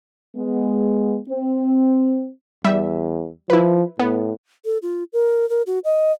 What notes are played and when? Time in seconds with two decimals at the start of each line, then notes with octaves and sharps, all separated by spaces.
0.36 G#3 B3
1.29 C4
2.64 E2 G3 E5
3.50 F3 E4 B4
3.99 A2 B3
4.65 A4
4.82 F4
5.13 A#4
5.50 A#4
5.67 F#4
5.85 D#5